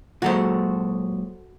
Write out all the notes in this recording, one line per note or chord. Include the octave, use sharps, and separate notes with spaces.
A#2 F#3 G#3 F#4 A4 C5